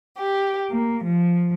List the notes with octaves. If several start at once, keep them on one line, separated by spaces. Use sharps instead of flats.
G4
A#3
F3